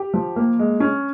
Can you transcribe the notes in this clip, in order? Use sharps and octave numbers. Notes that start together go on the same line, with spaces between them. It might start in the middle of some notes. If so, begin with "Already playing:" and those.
Already playing: G4
F3
A#3
G#3
C#4